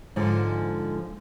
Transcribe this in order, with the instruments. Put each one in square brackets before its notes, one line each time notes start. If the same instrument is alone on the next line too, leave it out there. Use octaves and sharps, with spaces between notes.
[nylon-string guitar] G#2 D3 F3 G#3